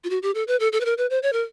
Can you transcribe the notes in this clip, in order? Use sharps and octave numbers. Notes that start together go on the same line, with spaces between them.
F4
F#4
G4
A4
B4
A4
A4
B4
A#4
B4
C5
C#5
A#4